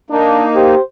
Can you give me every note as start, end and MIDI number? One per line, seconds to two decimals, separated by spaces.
0.10 0.75 58
0.10 0.44 62
0.10 0.75 63
0.55 0.80 67
0.55 0.82 72